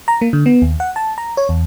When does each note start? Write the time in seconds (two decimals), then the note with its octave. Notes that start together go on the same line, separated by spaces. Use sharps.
0.08 A#5
0.21 A#3
0.33 D3
0.46 B3
0.62 D#2
0.80 F#5
0.96 A5
1.18 A#5
1.37 C#5
1.49 E2